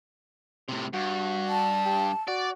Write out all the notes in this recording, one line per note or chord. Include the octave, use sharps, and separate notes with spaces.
A2 C3
G2 F#4
A5
G4
F#4 D5